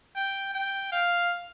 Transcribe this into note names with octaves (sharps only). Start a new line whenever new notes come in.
G5
G5
F5